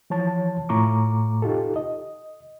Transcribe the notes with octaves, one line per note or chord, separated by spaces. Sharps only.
E3 F3 C#5 A5
A2 A3 F4 A#5 C#6 D6
D#4 F4 G4 A4
D#5